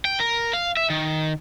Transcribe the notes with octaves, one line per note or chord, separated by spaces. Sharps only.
G5
A#4
F5
E5
D#3